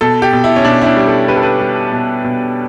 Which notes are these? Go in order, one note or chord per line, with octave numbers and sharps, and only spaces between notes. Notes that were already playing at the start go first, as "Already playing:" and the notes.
B2 A4
G4
B2
E4
C#4
B2 D4
E4
D4
G3
A4
G3 B4
A4
B4
G3
B2
B2